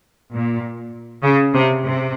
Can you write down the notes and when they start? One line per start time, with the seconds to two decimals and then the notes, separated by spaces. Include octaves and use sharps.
0.31 A#2
1.23 C#3
1.54 C3
1.85 C3